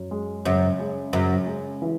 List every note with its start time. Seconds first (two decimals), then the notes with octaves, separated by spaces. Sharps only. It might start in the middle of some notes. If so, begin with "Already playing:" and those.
Already playing: F#2
0.11 G#3
0.45 F#2 C#3
0.79 G#3
1.13 F#2 C#3
1.47 G#3
1.82 E3